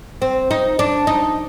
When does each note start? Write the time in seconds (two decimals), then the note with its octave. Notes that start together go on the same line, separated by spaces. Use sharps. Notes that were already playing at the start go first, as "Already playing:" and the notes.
0.22 C4
0.51 D#4
0.79 D4
1.07 D#4